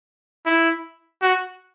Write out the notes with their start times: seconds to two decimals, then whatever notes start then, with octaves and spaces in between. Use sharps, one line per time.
0.46 E4
1.22 F#4